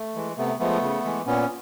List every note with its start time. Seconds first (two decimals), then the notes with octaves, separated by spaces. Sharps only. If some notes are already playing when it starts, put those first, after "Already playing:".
Already playing: A3
0.15 E3 G#3
0.37 C3 A3 B3
0.59 F3 G#3 A3 B3
0.82 C#3
1.04 E3 G#3
1.26 A#2 B3 C#4